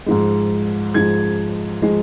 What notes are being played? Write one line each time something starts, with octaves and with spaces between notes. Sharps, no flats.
G#2 F3 G#3
G#2 F3 G#3 G#6
F3 G#3